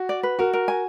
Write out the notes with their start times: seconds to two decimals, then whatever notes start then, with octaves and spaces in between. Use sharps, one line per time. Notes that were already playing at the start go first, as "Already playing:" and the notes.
Already playing: F#4
0.09 D5
0.23 B4
0.39 F#4 A#4
0.53 A#4
0.68 G#5